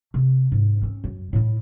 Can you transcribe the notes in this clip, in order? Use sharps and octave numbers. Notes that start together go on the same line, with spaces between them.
C3
G#2
C4 C#4
F#2
A2 E4